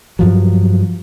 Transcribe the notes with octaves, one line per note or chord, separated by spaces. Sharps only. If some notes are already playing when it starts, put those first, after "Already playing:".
G2 F3 F#3